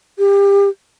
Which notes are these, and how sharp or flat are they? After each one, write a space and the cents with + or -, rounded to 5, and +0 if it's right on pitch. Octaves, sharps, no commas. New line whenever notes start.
G4 +30